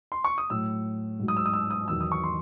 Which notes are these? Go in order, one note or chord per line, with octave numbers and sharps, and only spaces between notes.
C6
C#6
D#6
A2 F#3 E6
G#2 F#3
D#6
E6
D#6
E6
D#6
E2 D#3 F#3 E6
D#6
C#6
C6